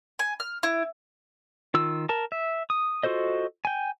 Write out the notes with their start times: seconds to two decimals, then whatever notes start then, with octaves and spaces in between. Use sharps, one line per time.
0.19 G#5
0.40 F6
0.63 E4
1.74 D#3 F4 E6
2.09 A#4 A5
2.32 E5
2.70 D#6
3.03 F4 F#4 A4 C5 D#5
3.65 G5 G#5